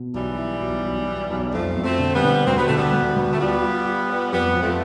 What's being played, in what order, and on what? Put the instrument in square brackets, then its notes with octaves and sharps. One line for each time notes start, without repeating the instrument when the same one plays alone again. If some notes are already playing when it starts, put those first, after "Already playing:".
Already playing: [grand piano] B2
[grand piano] B1 [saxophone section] E3 G3
[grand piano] E4
B1
B1
B1
B1
[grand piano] F2 [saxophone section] F3 A3
[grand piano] F2
[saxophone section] A3 C4
[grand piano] D3
[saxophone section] G3 B3
[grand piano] D3
[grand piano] D2 [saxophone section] C4
[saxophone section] B3
[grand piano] D3 [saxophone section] A3
[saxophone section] G3 B3
[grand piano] D2
D2
[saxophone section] A3
[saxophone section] G3 B3 [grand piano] F4
[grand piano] F4
F4
B4
[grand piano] F2 [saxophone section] G3 B3
[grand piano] F2
[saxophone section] F3 A3